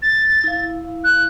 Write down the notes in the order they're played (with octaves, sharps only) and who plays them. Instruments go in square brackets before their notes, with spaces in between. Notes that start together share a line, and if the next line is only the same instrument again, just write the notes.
[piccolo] A6
[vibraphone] E4 F5
[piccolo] F#6